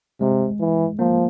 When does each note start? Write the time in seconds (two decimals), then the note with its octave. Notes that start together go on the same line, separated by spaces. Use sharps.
0.21 C3 G#3
0.60 E3
0.99 F3 A#3